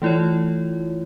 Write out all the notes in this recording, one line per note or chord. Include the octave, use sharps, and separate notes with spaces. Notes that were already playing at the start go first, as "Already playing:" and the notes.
E3 A3 E4 F4 C#5